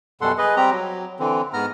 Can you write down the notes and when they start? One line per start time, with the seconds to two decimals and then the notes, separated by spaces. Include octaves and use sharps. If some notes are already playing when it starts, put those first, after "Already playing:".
0.21 F#2 B2 G3 A4 F#5 C6
0.38 G#4 B4 D#5
0.57 G3 C4 G4 A#5
0.70 F#3
1.20 D3 E3 C4
1.53 G#2 B3 A#5 F6